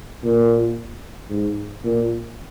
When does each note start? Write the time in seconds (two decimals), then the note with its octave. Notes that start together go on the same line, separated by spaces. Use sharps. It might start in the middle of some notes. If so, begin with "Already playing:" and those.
0.25 A#2
1.30 G#2
1.84 A#2